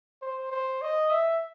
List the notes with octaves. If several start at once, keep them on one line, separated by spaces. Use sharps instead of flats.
C5
C5
D#5
E5